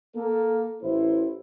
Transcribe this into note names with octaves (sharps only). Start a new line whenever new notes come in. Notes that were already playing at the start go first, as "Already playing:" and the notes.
A#3 A4
A1 E4 C5